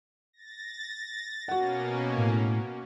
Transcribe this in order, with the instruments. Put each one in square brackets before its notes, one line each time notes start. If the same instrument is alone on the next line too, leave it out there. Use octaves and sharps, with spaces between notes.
[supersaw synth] A6 A#6
[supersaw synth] B2 A#3 C#4 [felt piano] F#4 F#5
[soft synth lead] A2